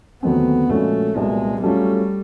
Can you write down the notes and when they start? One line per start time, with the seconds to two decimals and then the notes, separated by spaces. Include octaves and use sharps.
0.23 D#2 D3 F#3 A3 B3 C4
0.69 A#2 F3 G#3 A3 C#4 F#4
1.15 C2 A#2 F#3 G#3 B3 D4
1.62 F#3 G3 A3 C#4 F4 A4